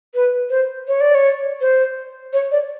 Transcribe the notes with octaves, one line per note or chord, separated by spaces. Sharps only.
B4
C5
C#5
D5
C#5
C5
C#5
D5